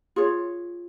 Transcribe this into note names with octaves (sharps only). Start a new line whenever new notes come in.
F4 G#4 C#5